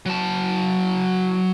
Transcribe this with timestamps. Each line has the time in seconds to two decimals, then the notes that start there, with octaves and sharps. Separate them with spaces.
0.06 F#3 A5